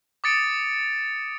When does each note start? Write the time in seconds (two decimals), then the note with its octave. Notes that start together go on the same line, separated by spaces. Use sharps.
0.24 D6 D#6 A6 C#7 D7